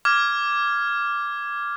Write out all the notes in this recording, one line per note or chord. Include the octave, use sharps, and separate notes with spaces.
D6 F6 G#6